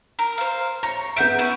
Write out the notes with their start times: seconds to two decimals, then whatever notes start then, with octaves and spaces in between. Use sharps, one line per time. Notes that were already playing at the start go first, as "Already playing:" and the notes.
0.19 A#4
0.38 C5 F5
0.83 C#5 A#5
1.16 B3 E5 F#5 G6 D7
1.39 C#4 E4